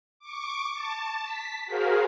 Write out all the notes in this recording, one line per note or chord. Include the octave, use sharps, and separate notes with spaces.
C#6 D6
A5
B6
F#4 G#4 A#4 C5 F5